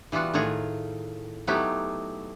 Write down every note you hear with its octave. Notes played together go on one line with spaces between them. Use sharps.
E3 G3 B3 F4 F#4
A2 D#3 F4 G#4 F#5 A#5
F#3 A3 B3 D#4 E4 G4